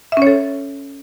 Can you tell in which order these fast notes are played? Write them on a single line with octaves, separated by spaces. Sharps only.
E5 C#4 C#5 A4